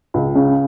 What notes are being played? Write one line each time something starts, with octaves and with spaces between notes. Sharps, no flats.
C#2
C#3